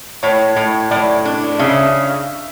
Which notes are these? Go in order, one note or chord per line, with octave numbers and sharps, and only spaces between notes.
A2 C#5
A2
A2 D5
D4
C#3 E5